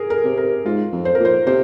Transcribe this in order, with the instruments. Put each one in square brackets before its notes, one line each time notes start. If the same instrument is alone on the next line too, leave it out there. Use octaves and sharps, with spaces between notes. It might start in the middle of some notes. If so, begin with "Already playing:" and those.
Already playing: [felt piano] G#4 A#4
A#4
[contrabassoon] C3
[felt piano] A#4
[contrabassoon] G#2 [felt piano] F4
[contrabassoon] F2
[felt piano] C5
A#4
[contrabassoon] A#2
[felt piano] C5
[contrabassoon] C3 [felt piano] C5